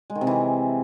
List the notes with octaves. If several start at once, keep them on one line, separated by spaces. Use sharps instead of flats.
G#3
D#3
C3
E3